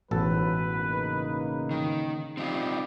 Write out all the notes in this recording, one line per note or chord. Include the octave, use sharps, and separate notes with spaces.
A1 E2 G#2 B2 F#3 A4 B4
C#3 A#3 D#4
D#3
G3 C4 D#4 F4